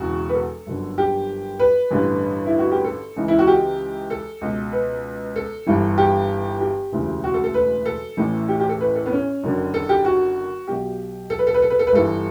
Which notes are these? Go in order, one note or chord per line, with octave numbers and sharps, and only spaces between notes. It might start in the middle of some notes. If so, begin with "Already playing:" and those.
Already playing: E1 E2 C#3 F#4
B4
A4
G1 F#2 D3
G4
B4
A1 G2 D3
E4
F#4
G4
A4
C#2 C#3 E3
E4
F#4
G4
A4
C#2 B2
B4
A4
G1 G2 E3
G4
G4
E1 D2 C#3 E3
F#4
A4
A4
B4
A4
A1 A2 E3
G4
G4
A4
B4
A4
B3
C#4
F#1 F#2 D3
A4
G4
F#4
B1 B2 G4
A4
B4
A4
B4
A4
B4
A4
B4
G1 G2 E3 A4